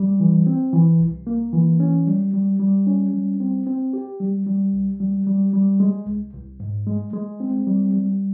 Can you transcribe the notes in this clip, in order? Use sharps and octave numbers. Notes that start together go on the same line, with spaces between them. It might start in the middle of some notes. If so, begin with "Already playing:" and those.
Already playing: G3
E3
C4
E3
C2
A#3
E3
C#4
G3
G3
G3
C#4
G3
C4
C4
G4
G3
G3
C2
G3
G3
G3
G#3
C2
C2
G#2
G#3
G#3
C4
G3
G3